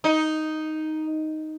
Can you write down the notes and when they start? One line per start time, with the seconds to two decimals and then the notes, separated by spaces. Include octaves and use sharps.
0.04 D#4